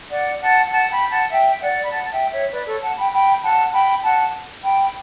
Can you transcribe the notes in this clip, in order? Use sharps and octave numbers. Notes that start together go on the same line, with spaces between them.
D5 F#5
F#5 A5
F#5 A5
G5 B5
F#5 A5
E5 G5
D5 F#5
B5
F#5 A5
A5
E5 G5
C#5 E5
B4 D5
A4 C#5
F#5 A5
G5 B5
G5 B5
F#5 A5
G5 B5
F#5 A5
G5 B5